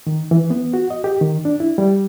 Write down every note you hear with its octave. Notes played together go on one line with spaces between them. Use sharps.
D#3
E3
B3
F#4
D#5
G4
D#3
D4
E4
G3